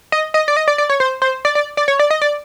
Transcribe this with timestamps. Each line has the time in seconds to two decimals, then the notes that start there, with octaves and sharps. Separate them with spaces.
0.12 D#5
0.34 D#5
0.48 D5
0.57 D#5
0.68 D5
0.78 D5
0.90 C#5
1.00 C5
1.22 C5
1.45 D5
1.55 D5
1.77 D5
1.88 C#5
1.99 D5
2.10 D#5
2.21 D5